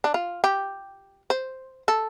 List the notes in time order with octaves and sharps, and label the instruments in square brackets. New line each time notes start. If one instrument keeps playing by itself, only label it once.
[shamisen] D4
F4
G4
C5
A4